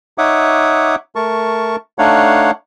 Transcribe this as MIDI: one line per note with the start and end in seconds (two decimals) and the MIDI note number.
0.18 0.96 63
0.18 0.96 73
0.18 0.96 76
0.18 0.96 78
0.18 0.96 86
0.18 0.96 87
1.16 1.76 57
1.16 1.76 70
1.16 1.76 81
1.16 1.76 85
1.99 2.51 57
1.99 2.51 62
1.99 2.51 63
1.99 2.51 73
1.99 2.51 77
1.99 2.51 78